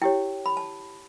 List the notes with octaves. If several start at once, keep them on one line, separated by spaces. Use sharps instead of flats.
E4 G4 C#5 G5
B5
A5